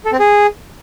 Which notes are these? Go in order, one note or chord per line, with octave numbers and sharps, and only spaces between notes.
A4
C4
G#4